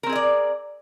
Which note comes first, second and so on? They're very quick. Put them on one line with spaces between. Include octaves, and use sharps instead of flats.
A#4 C4 G#4 D#5 D5